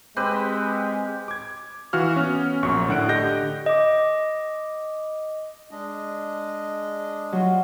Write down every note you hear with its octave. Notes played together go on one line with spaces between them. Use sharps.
G#3 C4 G4 B4
D6 G#6
E3 F#4 F5 F6
B3 C#4
A#1 F#2 C#6
A2 D3 F#5 F#6 D7
D3 G4 D#5 G6 A#6
D#5 D6
G#3 D4 D#5
F#3 F4